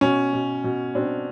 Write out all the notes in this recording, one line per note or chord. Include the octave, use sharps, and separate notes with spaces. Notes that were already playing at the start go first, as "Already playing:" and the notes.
B2 C#4
B2
B2
B2 C4 D4